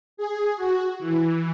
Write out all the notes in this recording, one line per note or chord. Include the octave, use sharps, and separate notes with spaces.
G#4
F#4
E3